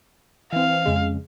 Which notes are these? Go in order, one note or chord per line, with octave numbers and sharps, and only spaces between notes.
E3 C4 F5
F2 C#3 G#3